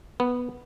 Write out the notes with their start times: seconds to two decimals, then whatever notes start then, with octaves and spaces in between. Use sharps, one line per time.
0.20 B3